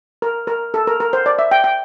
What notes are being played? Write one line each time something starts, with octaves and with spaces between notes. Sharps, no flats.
A#4
A#4
A4
A#4
A#4
C5
D5
E5
G5
G5